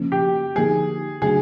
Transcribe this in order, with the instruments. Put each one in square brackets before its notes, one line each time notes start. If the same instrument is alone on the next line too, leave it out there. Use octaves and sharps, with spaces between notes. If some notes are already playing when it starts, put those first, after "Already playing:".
Already playing: [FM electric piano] C#3 F3 A#3 C#4
[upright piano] G4
[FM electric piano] D3 F3 A#3 D#4 G4 [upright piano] G#4
[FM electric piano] C#3 F#3 A3 D4 F#4 [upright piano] G#4